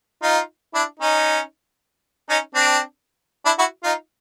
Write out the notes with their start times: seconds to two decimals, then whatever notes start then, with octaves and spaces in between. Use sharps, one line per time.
0.23 D#4 F4
0.75 D4 E4
1.00 C#4 D#4
2.29 C#4 D#4
2.55 C4 D4
3.46 D4 E4
3.59 E4 F#4
3.84 D#4 F4